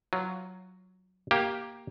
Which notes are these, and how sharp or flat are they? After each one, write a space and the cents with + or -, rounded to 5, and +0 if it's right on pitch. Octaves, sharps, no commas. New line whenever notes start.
F#3 +0 F4 +0
A#3 +5 G4 +0